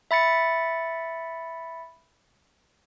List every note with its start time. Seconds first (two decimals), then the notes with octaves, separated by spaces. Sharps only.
0.11 E5 B5 A6 C#7